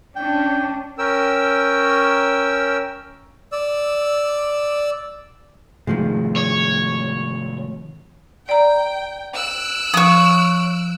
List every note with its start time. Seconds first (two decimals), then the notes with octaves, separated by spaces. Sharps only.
0.16 C#4 D4 G5
0.98 C#4 A#4 G5 E6
3.52 D5 E6
5.87 G#2 C3 D#3 F3 G#3 A3
6.36 C#5
8.49 D5 G5 A#5
9.34 E6 F#6 D7
9.94 F3 C#5 D#6